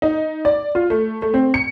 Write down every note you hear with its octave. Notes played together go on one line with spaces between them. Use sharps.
D#4
D5
F4
A3
A3
C4
C#7